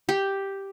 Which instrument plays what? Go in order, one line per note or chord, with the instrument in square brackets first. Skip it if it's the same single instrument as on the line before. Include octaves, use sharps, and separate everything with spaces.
[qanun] G4